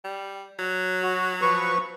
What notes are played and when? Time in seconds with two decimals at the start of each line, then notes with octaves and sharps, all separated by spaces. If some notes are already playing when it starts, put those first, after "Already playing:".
0.04 G3
0.59 F#3
1.03 F#4
1.42 F3 B4 C#6